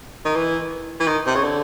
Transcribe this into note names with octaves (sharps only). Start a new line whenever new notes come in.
D#3
E3
E3
D#3
C3
C#3
D3